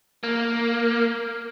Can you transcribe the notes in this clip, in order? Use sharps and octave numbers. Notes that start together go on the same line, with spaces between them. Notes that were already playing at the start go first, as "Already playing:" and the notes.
A#3